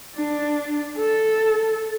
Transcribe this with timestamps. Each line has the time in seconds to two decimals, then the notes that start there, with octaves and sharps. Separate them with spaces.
0.15 D4
0.97 A4